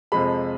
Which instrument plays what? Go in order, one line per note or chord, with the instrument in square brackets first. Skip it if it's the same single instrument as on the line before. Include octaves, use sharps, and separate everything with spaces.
[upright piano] F2 C3 F3 G#3 B5